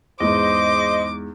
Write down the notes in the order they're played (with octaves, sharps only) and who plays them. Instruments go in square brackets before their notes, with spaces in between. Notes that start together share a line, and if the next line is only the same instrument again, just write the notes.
[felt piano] E2 G#2 [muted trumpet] C5 [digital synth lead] D#5 [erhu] D6